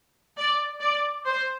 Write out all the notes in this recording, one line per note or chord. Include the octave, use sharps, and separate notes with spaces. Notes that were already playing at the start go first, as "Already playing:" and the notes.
D5
D5
C5